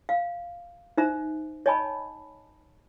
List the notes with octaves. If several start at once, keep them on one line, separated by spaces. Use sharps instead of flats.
F5
D#4 C5 E5 A#5
C#5 D#5 G#5 A5 B5